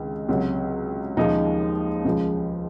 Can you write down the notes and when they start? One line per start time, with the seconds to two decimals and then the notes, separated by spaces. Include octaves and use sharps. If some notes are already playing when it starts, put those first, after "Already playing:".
Already playing: C#2 C3 D#3 G#3
0.28 C#2 C3 F#3
1.17 D#2 C#3 F3 G#3 D#4
2.05 C#2 C#3 F3 G#3